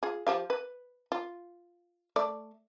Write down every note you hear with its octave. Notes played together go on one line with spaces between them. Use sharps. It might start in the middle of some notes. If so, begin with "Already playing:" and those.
F4 G#4
F3 G4 F5
B4
F4
A3 D5